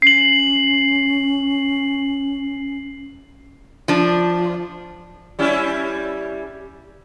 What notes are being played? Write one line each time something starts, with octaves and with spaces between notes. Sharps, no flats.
C#4 C7 F#7
F3 D4
G3 C#4 E4